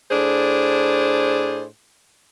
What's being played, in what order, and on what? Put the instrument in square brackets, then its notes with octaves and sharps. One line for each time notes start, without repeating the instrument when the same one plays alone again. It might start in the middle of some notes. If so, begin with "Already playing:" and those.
[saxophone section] A2 D4 G#4 C5